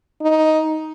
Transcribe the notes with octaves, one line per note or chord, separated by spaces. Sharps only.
D#4